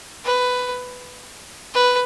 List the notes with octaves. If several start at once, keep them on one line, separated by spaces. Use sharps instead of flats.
B4
B4